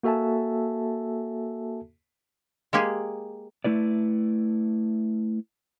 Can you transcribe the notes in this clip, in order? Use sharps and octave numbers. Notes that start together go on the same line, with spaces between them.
A#3 F#4 A4 E5 G#5 A5
G#3 A#3 G4 G#4
A3 E4 B4 D5